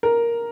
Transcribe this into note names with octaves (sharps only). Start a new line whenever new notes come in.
A#4